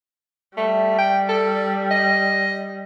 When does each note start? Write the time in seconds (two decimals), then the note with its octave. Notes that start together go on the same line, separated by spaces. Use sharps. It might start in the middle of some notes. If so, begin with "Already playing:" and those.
0.57 G3 A3
0.98 G5
1.29 A4
1.90 D#5